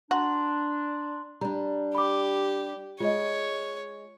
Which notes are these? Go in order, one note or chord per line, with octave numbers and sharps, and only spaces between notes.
D4 F#4 A#5 C6 F#7
G3 D4 A#5
G4 B5 D6
G#3 F4 C#5 D#5